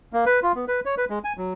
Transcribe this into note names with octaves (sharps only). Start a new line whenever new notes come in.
A#3
B4
F4
B3
B4
C#5
B4
G#3
G#5
F#3